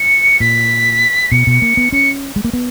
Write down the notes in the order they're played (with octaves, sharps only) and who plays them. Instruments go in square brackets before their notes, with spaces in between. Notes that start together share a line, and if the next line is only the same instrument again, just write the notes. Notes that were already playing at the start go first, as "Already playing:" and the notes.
Already playing: [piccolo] C#7
[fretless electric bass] A#2 [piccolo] B6
[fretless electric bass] B2 [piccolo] C#7
[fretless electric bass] B2
A#3
B3
[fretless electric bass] C#4 [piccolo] C#7
[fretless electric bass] G#3
A#3
B3